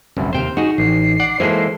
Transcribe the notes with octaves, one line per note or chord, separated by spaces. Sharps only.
G1 C2 F#2
D#2 C3 C5 F5 G5
D#4 F#4 G#4
A1 C7
D5 F#5
E3 G#3 A#3 A4 C5